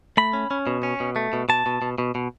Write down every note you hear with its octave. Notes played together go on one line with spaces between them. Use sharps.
A3 B5
C#4
C#4
B2
C#4
B2
A3
B2
B2 A5
B2
B2
B2
B2